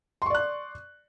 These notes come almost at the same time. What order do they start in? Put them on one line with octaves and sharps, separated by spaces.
C6 C#6 D5 F#6